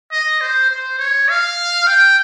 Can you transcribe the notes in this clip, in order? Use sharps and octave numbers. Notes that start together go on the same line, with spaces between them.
D#5
C5
C5
C#5
F5
G5